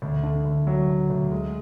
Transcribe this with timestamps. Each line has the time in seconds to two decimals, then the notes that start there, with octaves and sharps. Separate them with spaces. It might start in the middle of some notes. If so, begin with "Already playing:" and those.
0.02 D2
0.23 D3
0.45 D2
0.67 F#3
0.88 D2
1.10 D2
1.32 G#3